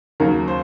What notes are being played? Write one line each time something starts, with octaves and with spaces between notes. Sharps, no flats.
D#2 C#3 F#3 A#4
C5